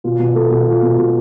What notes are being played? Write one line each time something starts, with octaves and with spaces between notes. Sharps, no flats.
B2 F4
B2
B2 A4
B2
B2 F4
B2
B2